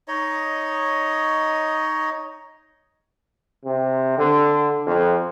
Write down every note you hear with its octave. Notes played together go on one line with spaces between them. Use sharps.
D#4 C#5 D#5
C3
D3
F2